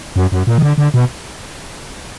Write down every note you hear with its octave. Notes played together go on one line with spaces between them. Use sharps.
F#2
F#2
A#2
D#3
D3
D3
B2